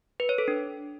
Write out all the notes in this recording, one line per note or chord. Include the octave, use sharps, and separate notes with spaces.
B4
C#5
A4
D4